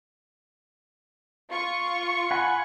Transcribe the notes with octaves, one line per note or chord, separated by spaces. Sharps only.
F4 C#6
F#5 G#5 B5